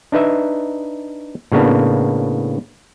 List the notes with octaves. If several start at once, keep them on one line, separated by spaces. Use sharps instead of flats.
D4 D#4 B4 E5
A2 C#3 A#3 B3 D4